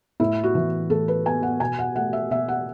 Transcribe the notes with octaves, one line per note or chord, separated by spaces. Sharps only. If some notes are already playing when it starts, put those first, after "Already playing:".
A2 E4
F#4
E3
A2 A4
B4
B3 G#5
F#5
B2 G#5
F#5
A3 F#5
E5
B2 E5
F#5